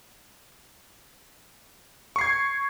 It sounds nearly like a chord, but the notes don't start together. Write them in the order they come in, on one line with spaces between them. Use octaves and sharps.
C#6 C7 G#6